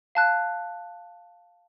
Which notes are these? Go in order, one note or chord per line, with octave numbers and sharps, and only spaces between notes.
F5 A5 F#6